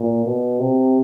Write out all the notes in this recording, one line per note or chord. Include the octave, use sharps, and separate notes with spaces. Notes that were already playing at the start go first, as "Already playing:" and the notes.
Already playing: A#2
B2
C3